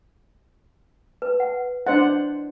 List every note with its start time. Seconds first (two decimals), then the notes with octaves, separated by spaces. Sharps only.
1.22 B4
1.40 F#5
1.87 D4 E4 C5 D#5 F#5